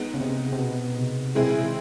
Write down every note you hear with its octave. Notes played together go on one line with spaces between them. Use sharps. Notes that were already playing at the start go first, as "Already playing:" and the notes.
Already playing: G#3 B3 D#4
C#3
C3
C3
B2
C3
B2 G#3 C4 E4 G#4
C3
D#3